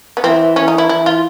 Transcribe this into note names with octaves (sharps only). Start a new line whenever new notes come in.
B3
E3 C4
E3 C#4
D#4
E4
E3 E4
F4